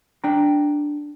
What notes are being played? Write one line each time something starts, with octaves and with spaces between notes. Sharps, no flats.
D4 G5 A#5